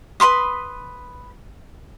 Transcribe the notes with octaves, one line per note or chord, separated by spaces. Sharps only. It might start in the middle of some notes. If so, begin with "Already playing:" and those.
B4 B5 C6 D#6